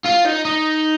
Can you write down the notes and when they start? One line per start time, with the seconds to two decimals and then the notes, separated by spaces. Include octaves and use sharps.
0.06 F4
0.26 D#4
0.45 D#4